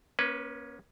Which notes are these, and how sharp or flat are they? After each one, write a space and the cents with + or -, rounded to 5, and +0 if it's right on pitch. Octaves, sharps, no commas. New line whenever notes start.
A#3 +35 C#4 +0 B4 +0